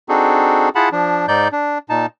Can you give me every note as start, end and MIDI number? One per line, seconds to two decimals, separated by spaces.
0.09 0.69 60
0.09 0.69 62
0.09 0.69 63
0.09 0.69 66
0.09 0.69 68
0.09 0.69 69
0.75 0.89 64
0.75 0.89 65
0.75 0.89 68
0.75 0.89 78
0.75 0.89 81
0.75 0.89 83
0.92 1.26 53
0.92 1.26 62
1.28 1.48 44
1.28 1.48 63
1.28 1.48 74
1.28 1.48 91
1.52 1.78 62
1.89 2.06 46
1.89 2.06 63
1.89 2.06 81